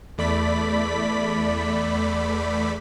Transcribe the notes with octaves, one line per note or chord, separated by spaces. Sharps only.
E2 A3 D5 B5 B6